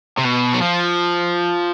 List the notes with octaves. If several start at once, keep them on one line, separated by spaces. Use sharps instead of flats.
C3
B2
F#3
F3